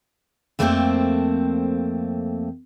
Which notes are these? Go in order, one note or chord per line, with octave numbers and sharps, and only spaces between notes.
F2 A3 A#3 C4 G#4 C5